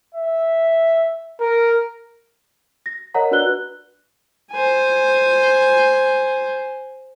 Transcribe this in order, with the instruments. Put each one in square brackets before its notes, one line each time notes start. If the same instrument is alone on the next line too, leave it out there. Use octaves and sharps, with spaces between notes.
[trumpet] E5
A#4
[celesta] A#6
A#4 C#5 D#5 F#5 A#5
D4 F#4 B4 D5 F#6 G7
[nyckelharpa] C5 G#5